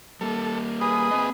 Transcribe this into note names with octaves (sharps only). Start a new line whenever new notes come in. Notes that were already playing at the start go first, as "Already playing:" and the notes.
G3 A#3 A4
G#4 B4 D#6
A#3 C4 D#5